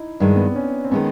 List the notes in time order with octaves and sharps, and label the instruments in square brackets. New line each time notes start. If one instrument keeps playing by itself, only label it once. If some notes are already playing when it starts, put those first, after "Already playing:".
Already playing: [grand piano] D#4 E4
[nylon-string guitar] G2 D#3 G#3 [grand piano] D4
[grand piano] B3
C4
C#4
C4
[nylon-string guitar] D#3 G#3 C#4 [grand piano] B3